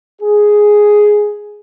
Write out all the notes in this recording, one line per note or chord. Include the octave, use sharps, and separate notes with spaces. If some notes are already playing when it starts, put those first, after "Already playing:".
G#4